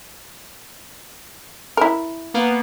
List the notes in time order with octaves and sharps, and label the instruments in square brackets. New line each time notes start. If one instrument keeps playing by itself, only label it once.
[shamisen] E4 A#4
[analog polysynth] A#3 B3